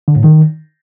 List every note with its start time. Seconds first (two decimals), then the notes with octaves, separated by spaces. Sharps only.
0.08 D3
0.16 A2
0.24 D#3